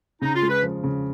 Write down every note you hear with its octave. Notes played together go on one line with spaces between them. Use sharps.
C#3 D#4
F4
G#3
B4
F3
C#3